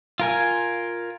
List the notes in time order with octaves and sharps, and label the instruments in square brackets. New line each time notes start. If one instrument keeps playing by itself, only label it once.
[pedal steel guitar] F4 A#4 G#5